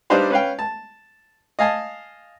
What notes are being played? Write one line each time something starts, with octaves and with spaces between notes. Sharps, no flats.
G3 D4 D#4 B4 C5 F5
C#4 B4 F5 G5
A5
D#5 F5 G#5 A5